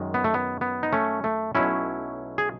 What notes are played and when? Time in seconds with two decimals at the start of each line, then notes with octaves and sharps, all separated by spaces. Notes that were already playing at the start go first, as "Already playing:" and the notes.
Already playing: F#2 D#3 G#3
0.14 B3
0.24 A3
0.34 B3
0.61 B3
0.83 D#4
0.93 A3 C#4
1.24 A3
1.55 B1 B2 F#3 A3 C#4 E4
2.38 G#4